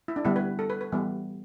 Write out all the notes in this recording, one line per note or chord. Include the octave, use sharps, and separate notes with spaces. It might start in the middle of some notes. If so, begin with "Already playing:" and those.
E4
D4
D3 G3 B3 E4
B4
A4
B4
B4
E3 G3 B3